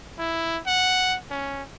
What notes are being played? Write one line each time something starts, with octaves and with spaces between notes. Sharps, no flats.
E4
F#5
C#4